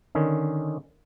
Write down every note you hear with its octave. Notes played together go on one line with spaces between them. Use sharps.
D3 D#3 C#4